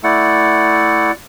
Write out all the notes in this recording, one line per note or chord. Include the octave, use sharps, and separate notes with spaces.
A3 E4 D5 F#5